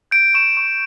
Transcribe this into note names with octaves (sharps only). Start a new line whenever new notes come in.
G6 D7
C#6 E7
C#6